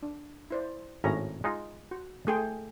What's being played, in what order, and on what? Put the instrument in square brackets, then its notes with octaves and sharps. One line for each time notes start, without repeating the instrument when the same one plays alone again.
[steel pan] D4
E4 C5 D5
[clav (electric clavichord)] G#1 A2 C#4 [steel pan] F#4 A#5
[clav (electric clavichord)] G#3 D#4 F4
[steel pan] F#4
A3 G#4 G5